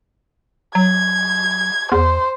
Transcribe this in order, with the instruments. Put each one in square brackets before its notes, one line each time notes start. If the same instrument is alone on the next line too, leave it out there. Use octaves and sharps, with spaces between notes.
[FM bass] F#3 [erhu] G#6
[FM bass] E2 [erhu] C5